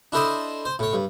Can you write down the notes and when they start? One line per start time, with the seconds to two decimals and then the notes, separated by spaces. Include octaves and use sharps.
0.12 D4 E4 A4 C5 D#5 C6
0.65 C5
0.79 A2 C#5
0.93 G2